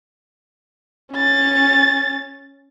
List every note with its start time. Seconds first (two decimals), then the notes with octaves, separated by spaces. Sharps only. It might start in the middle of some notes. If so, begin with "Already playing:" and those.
1.13 C#4 A6